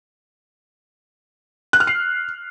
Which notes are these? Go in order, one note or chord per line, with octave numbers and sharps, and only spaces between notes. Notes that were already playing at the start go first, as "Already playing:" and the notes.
F#6
F6
C7